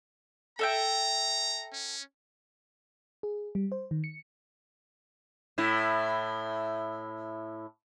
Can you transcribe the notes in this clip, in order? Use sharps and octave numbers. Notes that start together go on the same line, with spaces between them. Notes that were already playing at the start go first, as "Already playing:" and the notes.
A4 E5 G5 A#5
C#4
G#4
G3
C5
D#3
C#7
A2 E4